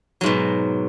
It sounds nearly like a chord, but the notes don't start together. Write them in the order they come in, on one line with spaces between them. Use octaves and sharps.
F#3 G#2 B2